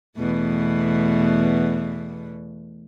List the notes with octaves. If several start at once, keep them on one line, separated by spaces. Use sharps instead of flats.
E2 B2 A3